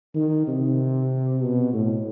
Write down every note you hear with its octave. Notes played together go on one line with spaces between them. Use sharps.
D#3
C3
B2
A2